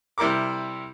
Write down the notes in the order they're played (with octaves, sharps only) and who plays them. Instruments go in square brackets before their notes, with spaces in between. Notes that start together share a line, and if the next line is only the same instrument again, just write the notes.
[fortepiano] C3 G3 E4 A#4 D6